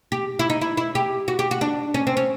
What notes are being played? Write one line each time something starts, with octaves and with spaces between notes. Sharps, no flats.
G4
E4
D#4
E4
E4
G4
F#4
G4
F#4
D4
C#4
C4
C#4